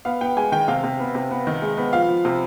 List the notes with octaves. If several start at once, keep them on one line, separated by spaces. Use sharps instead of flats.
B3 F5
B3 G5
G#3 G#5
D#3 G5
C3 F5
C3
B3
C3
B3
D#3
G#3
B3
F3 F5
F3
C3